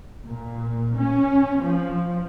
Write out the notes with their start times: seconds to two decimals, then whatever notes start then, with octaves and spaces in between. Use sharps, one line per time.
0.24 A#2
0.98 C#4
1.60 F3